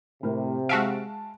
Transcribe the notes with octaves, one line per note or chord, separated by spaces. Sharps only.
A2 C3 A#4
G#3 F#4 E5 F5 A5 D7